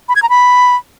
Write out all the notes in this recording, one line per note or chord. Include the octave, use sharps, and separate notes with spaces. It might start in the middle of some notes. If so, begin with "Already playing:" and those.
B5
G#6
A#5
B5